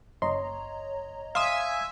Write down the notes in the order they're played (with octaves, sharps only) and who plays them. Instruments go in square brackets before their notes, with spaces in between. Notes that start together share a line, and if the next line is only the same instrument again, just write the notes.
[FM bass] F#1 [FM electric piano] C#5 D#5 A#5 [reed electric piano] C6
[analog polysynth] E5 G#5 [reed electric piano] F5 C6 D#6